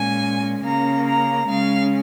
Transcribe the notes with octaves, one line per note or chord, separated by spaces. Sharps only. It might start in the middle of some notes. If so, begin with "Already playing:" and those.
Already playing: A#2 G#3 C#4 G#5
C#3 A#3 C#4 A#5
A#5
C#3 G#3 C#4 F5